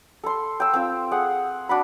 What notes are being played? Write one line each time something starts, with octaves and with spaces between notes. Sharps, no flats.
A4 C6
G5 E6
C4 F4
G#4 F#5
D4 F#4 B5